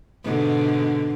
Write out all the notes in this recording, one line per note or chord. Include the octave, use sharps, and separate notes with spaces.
G#2 B2 D3